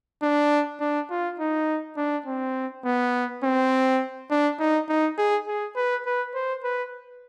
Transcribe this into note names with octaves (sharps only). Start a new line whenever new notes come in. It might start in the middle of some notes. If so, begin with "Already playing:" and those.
D4
D4
F4
D#4
D4
C4
B3
C4
D4
D#4
D#4
G#4
G#4
B4
B4
C5
B4